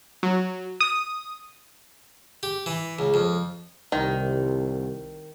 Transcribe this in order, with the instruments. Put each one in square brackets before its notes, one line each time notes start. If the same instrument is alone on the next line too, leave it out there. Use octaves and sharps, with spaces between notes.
[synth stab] F#3
D#6
[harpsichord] G4
E3
C#2
F2
[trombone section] C2 [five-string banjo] D#3